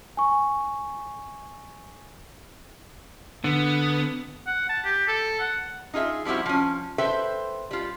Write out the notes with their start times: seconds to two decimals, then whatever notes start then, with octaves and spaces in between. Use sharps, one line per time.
0.17 G#5 C#6
3.44 D3 B3
4.47 F#5
4.69 A5
4.84 G4
5.08 A4
5.40 F#5
5.94 D#4 F4 G#4 E5
6.25 F3 G3 C4 E4 F#4
6.46 F3 C#4
6.98 A4 B4 C5 E5 G5
7.71 G3 F4